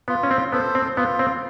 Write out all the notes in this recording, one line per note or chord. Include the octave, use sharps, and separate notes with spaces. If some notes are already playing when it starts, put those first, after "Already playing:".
B3 F4
C#4
C4
B3 A4 C5
C4
B3 F4
C4